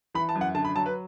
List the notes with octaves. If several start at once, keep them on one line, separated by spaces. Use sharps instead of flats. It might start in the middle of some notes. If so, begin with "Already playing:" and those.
E3 B5
A5
F#2
F#5
D3 A5
B5
F#3 A5
B4